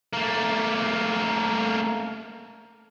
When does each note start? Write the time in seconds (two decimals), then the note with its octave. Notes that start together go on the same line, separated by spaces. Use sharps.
0.13 A3 A#3